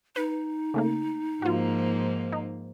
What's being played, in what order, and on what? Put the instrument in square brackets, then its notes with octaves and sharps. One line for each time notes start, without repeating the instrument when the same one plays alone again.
[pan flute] D#4 [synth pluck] B4
[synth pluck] C#3 A3 A#3
[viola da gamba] G#2 F3 A#3 [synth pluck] F4 F#4
[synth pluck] D#4